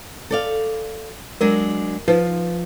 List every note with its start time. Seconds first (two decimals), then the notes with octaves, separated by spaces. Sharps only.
0.30 A4 D5 F5
1.41 F#3 G#3 D4 A#4
2.08 F3 D#4 B4